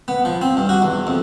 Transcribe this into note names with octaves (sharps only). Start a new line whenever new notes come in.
B3
F3
C4
G2
F#4
E2
F2